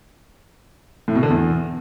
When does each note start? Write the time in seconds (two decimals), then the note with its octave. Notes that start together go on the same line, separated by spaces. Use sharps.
1.08 A2
1.15 B2
1.23 D3
1.30 E2